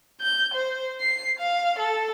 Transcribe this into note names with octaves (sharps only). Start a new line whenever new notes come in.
G6
C5
C7
F5
A4